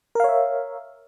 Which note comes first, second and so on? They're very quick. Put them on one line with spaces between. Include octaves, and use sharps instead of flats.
A#4 F5 C#5 E5